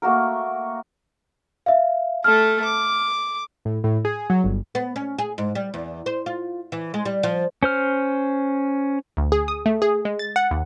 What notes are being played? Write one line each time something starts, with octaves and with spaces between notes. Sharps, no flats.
A3 A#3 F#4 A#4
E5 F5
A3 A4 F6
D6
A2
A2
G#4
F#3
G1
B3
C#4
G#4
G#2
G3
E2
C5
F4
E3
G#3
G3
F3
C#4 C5 F6
D2
G#4
D#6
A3
G#4
G#3
A6
F#5
D#2